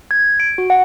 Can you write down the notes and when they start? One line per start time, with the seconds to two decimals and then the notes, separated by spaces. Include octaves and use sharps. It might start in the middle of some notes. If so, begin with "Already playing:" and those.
0.11 G#6
0.40 D7
0.58 F#4
0.70 F#5